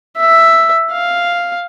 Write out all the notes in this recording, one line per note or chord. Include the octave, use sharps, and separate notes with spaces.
E5
F5